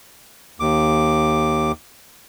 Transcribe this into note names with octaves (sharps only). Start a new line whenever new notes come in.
D#2 D6